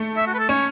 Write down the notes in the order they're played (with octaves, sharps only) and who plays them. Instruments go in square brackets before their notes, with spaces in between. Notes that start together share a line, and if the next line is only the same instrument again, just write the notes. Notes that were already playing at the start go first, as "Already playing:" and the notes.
Already playing: [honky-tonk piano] A3
[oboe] E5
F#4
B4
A4
[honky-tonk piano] C#4 [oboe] C#5